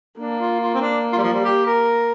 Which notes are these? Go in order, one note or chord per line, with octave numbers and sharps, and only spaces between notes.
A#3 D4
F4
F4
C4
D4
F4
G3
F3
G3
G4
A#4